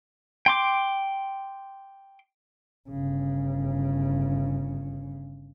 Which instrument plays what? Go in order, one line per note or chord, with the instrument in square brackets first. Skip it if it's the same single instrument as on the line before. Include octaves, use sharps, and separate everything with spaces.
[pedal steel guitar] G5 C6 D6
[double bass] G1 C#3